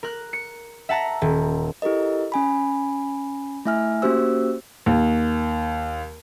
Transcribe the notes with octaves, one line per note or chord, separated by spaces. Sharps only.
A#4 F#6
C#7
E5 F#5 A5 A#5
D#1
E4 G4 A4 A#4 D#5
C#4 G#5 B5
A3 E4 E5 G#5 F6
A#3 C#4 F#4 G4 C5 E6
D#2